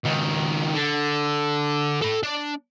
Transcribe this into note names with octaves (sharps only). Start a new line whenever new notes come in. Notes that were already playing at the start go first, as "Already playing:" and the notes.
C#2 D#3
D3
A4 B5
D4